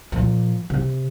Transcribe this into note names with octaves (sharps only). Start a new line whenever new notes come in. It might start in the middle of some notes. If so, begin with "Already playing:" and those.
A#2 F3
C3